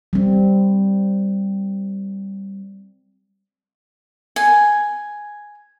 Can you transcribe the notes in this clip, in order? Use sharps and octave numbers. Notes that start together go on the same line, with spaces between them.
G3 C4
G#5